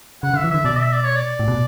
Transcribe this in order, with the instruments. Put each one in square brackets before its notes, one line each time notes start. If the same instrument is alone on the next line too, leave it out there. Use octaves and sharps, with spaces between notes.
[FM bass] C#3 [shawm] F#5
[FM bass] D3
[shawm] E5
[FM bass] E3
[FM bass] D3 [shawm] E5
[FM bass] B2 [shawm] D5
[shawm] E5
D5
C#5
D5
[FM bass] A2
B2